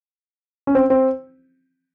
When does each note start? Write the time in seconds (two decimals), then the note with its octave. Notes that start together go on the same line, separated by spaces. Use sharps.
0.67 C#4
0.75 C4
0.90 C4